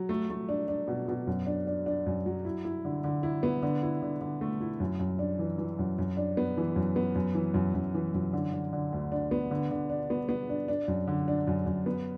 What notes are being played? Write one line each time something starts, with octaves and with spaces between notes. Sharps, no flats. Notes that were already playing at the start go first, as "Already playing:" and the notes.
Already playing: F#3
A3
A3
D4
D4
B2
B2
F#2
D4
D4
D4
F#2
F#3
E4
E4
D3
D3
E4
B3
D3
E4
D3
D3
A3
E4
F#2
F#2
D4
E3
E3
F#2
F#2
D4
B3
E3
F#2
B3
F#2
E3
F#2
F#2
E3
F#2
D3
D3
D3
D2
D4
B3
D3
D3
D4
B3
B3
D4
D4
F#2
D3
D4
F#2
F#2
B3